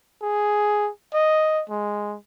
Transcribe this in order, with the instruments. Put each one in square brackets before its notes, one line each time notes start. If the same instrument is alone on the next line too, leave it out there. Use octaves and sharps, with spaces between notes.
[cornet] G#4
D#5
G#3